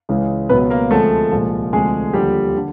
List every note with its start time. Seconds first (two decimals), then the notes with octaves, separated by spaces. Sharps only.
0.09 C#2 C#3 E3 G#3
0.49 C#2 B2 F#3 B3 B4
0.70 A#3 A#4
0.91 D2 C3 F3 G#3 A3 A4
1.32 C2 A#2 F3 G#3
1.73 D2 C3 F3 G#3 G#4
2.14 D#2 D3 F3 G3 G4
2.57 D3